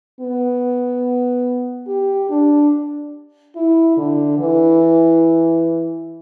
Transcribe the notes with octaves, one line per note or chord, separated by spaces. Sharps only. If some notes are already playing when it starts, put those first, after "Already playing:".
B3
G4
D4
E4
D3
E3